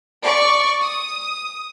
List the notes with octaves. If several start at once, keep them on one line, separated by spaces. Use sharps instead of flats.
D5 C#6
D#6